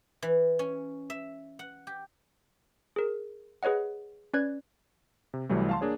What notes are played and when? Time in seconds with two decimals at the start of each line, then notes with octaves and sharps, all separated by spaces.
0.22 E3
0.59 C#4
1.10 E5
1.59 F#5
1.87 G4
2.96 G#4 A#4
3.63 G#4 B4 C#5 D#5 F#5
4.34 C#4 B4 D5 F#6 G#6
5.34 C3
5.49 C2 E3 F#3 G3 A3
5.69 F5 A5 C6
5.81 A#3 D4 G#4 C#5